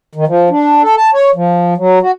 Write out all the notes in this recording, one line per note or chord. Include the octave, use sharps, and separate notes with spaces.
D#3
F3
D4
A4
A5
C#5
F3
F#3
F#4